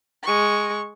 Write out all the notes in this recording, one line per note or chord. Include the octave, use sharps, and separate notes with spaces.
G#3 C#6